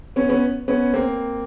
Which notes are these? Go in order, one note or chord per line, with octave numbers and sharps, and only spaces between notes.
B3 C#4
B3 C#4
B3 C#4
A#3 C4